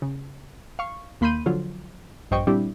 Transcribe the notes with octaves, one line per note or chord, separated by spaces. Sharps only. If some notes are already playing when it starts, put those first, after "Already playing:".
C#3
F5 C#6
D#2 A#3 B5 C6 G6 D#7
D3 F3 F#3 F4
A#1 G2 C5 D#5 G5 C#6
A#2 G3 C4 D4 E4 G4